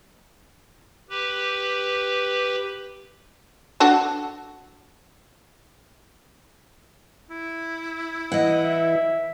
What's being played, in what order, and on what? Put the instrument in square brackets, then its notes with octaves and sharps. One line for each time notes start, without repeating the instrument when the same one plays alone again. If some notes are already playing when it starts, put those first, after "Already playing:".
[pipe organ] G4 B4
[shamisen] D4 F#4 A4
[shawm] E4
[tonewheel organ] E3 [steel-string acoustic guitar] D#5 F#5
[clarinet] E5